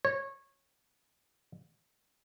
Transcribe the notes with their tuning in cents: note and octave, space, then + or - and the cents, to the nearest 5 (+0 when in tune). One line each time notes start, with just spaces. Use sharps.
C#5 -20